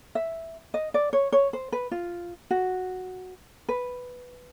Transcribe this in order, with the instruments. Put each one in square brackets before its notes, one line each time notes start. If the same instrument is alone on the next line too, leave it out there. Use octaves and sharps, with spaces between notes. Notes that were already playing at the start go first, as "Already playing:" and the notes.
[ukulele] E5
D#5
D5
C#5
C#5
C5
B4
F4
F#4
B4